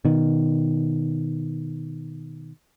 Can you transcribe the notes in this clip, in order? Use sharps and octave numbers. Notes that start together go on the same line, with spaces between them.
B2 D#3